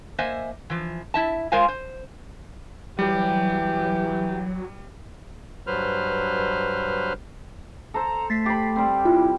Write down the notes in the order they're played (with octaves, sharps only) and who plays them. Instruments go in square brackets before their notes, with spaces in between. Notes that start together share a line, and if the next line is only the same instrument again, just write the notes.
[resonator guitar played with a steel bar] A#3 C5 D#5 E5 G#5
E3 F3
E4 E5 A5
G#3 F4 A#4 C5 F5 G#5
C5
[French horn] E3 [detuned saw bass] F#3 [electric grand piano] G3 [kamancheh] G4
[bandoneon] G2 F#3 B4 C5 F6
[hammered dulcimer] A4 C5 [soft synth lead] A#5
[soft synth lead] A3 [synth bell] A6 B6 C7
[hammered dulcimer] G4 B5
G3 C4
[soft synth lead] E4 [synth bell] F4